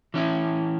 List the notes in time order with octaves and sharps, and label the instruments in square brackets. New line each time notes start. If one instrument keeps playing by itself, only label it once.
[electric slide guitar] E3 C#4 E4